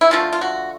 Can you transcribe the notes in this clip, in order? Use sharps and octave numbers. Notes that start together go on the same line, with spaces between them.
E4
D3 F3 A3 F4
F4
F#4